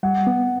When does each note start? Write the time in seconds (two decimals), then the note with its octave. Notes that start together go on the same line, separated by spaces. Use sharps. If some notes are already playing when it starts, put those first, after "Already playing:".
0.03 G3 F#5
0.27 B3